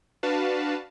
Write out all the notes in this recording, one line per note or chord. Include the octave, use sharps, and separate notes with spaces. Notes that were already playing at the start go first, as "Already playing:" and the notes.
D4 F#4 B4 F5 A5